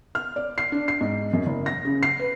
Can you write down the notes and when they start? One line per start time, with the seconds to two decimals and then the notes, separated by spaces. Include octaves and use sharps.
0.15 F6
0.36 D5
0.58 C7
0.72 D4
0.88 C7
1.01 G#2
1.33 F#2
1.46 F#1
1.66 A#6
1.85 C#3
2.03 C7
2.19 B4